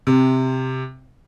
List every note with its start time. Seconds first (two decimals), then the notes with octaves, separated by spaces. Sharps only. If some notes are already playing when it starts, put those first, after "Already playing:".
0.07 C3